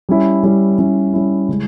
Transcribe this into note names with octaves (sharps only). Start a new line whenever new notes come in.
G3 C#4 E4
G3 C#4 E4
G3 C#4 E4
G3 C#4 E4
C#3 G#3 C#4 E4